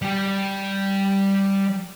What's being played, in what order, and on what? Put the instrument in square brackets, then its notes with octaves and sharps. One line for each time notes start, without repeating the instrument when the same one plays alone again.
[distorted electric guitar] G3 G4